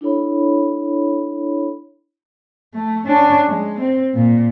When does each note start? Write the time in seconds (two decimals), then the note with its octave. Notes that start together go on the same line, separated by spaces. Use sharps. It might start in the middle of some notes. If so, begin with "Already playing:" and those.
0.01 D4 E4 A4 C#5 B5
2.74 A3
3.07 C#4 D4
3.47 G#3
3.81 C4
4.14 A#2